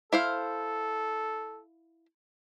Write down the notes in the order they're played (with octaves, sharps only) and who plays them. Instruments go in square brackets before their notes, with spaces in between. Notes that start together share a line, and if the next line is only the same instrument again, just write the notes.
[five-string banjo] E4 C5 F5 [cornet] A4